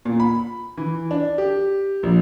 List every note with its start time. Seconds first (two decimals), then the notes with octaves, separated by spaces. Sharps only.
0.05 A#2
0.20 B5
0.77 E3
1.11 D4
1.38 G4
2.03 A#1